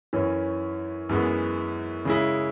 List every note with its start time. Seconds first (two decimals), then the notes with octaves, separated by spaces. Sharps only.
0.13 F#2 E3 C#4
1.09 F#2 E3 G#3 B3
2.05 C#3 G#3 E4